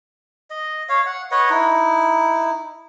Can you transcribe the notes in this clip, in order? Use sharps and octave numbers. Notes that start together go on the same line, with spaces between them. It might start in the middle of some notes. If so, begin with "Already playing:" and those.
D#5
C#5 F5
F#5
B4 C#5 D#5 F#5
D#4 E4